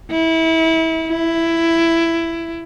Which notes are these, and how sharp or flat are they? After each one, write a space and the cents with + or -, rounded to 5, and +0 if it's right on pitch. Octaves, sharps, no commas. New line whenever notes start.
E4 -25
E4 +10